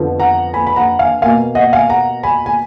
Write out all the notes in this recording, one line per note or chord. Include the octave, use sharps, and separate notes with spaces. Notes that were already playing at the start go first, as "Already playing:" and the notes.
Already playing: F2 D3 F3 B3
F#5 A#5
G#5 B5
B5
F#5 A#5
F5 G#5
B2 A#3 F5 G#5
D#5 F#5
F5 G#5
F#5 A#5
G#5 B5
G#5